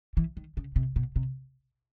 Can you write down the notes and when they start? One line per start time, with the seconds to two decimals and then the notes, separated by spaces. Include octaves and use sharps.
0.17 E3
0.37 D#3
0.57 C#3
0.76 C3
0.96 B2
1.16 C3